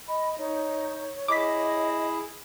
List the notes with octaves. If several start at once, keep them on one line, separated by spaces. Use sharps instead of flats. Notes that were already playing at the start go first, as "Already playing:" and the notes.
D#5 B5
D#4 C#5
E4 G#4 D#5 D6 B6